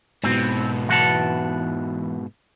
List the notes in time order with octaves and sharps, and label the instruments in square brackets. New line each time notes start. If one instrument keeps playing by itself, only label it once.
[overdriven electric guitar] G#2 B2 [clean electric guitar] C4
[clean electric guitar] E3 F#5 A5